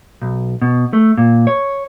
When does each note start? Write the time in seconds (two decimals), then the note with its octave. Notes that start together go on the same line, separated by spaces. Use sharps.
0.22 B1
0.62 B2
0.93 A3
1.18 A#2
1.47 C#5